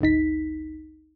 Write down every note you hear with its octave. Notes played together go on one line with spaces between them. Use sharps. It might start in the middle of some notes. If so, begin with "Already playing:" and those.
G#1 D2 D#4 B6